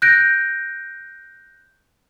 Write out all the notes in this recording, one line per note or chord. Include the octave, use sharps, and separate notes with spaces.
F#6 G6 A#6 D7